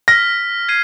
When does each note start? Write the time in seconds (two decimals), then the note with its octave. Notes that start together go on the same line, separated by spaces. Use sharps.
0.08 F6 A#6 B6
0.68 G#6 C7 D#7